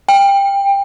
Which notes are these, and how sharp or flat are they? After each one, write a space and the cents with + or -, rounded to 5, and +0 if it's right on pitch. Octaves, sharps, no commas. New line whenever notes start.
G5 +20